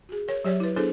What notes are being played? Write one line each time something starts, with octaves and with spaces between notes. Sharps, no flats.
F#4 G#4
A#4 C#5
F#3 G4 C#5 D5 E5
E4 B4
B3 D4 E4 G#4 A4 C5